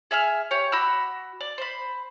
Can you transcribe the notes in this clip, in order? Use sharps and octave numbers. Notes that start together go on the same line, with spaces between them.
G#4 E5 G#5 F6
G4 C#5
F#4 B5 D6 E6
D5
C5 B5